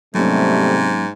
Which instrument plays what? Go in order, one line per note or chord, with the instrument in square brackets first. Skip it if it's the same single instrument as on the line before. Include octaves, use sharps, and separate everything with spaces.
[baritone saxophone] G#2 [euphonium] C3 [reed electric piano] F#3 A#3 C#4 [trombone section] G3 A3